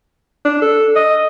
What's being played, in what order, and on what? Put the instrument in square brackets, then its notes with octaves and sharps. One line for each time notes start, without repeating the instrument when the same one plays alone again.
[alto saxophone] D4
A4
D#5